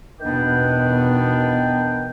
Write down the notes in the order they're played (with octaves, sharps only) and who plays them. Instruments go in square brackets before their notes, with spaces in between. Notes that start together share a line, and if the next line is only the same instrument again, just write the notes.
[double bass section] E2 B2 B3 [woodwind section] D#3 D4 G5